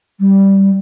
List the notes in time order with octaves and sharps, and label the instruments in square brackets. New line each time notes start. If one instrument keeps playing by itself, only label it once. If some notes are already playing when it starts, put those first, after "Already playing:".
[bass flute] G3